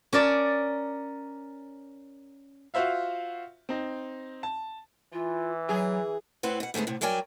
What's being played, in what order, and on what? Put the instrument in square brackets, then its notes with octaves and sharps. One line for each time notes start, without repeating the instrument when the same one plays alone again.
[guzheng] C#4 A#4 D5 A5
[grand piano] F4 F#4 C5 E5 F5
C4 D#4
A5
[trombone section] E3 [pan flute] F4
[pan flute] F#3 [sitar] G#4
[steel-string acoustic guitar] A2 C4 B4 F#5
B2 F#5
G#2 D3 A3 B3 G#4
A2 C3
G2 F#3 A#4 D5 G5 G#5